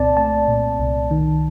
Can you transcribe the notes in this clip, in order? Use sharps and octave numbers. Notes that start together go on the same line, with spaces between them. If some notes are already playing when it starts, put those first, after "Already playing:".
Already playing: C2 A#2 C4 D5 A5
A3 A5
A#2
C2
D#3